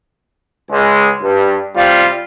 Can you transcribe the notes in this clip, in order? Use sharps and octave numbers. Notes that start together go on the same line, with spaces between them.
C#2 G#3
G2
C3 G3 F4